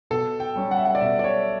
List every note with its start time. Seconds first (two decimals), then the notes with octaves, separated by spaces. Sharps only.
0.11 B2 A4
0.40 G5
0.55 G3 C#4
0.71 F#5
0.78 E5
0.85 F#5
0.95 D5
1.01 B2 E5
1.19 D5
1.24 C#5